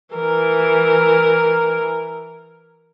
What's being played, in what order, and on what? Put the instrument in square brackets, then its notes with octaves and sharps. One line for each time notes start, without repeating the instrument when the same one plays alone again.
[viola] E3 A#4